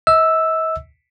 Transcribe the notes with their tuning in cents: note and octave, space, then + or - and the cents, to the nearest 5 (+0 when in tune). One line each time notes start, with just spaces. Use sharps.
D#5 +45 E6 +0